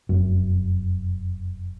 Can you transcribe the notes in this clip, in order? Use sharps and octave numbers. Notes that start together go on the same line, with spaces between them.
F1 F#2